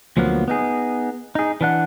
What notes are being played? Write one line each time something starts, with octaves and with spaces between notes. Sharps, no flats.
D2 F3 F#3 A#3 B3
B3 D#4 G#4
D#4 G#4
E3 D4 F#5